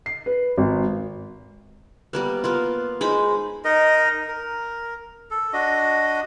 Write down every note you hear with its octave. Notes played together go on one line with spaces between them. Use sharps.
C7
B4
G#1
G3 A#3 B3
A#3 B3 F4
G#3 D#4 C5 B5
D#4 A#4 D#5
A#4
A4
D4 F#4 D#5